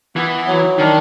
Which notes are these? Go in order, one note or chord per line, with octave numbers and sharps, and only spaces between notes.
E3 B3
F#3
D#3 D4